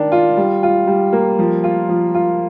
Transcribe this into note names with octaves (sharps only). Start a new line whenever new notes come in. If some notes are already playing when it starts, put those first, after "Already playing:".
Already playing: D#3 D4
F4
G3
F4
G3
A#3
F3
F4
F3
F4